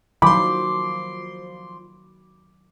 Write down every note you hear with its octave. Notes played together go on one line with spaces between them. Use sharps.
D#3 F3 F#3 B5 C6 D6